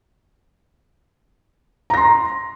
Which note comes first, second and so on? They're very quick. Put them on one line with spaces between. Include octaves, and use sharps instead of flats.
A#5 A#6 C6